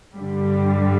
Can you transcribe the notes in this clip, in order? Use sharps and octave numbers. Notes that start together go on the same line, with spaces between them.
G2 D3 G3